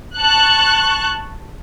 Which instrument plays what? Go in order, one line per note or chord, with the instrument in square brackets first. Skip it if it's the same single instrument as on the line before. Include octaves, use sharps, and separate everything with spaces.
[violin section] A5 C#6 F#6